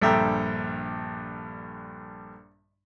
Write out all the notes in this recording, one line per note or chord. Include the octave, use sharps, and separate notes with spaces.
A#1 G2 D3 E5 G5 A#5